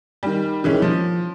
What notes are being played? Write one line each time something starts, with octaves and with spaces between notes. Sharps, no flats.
D#3 G3
D#3 E3 G#3 C#4
F3